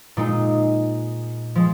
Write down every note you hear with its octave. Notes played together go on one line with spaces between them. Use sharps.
A#2 G#3 D#4
F3 G#3